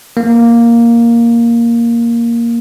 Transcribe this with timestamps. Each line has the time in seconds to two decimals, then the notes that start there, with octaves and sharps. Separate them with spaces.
0.17 A#3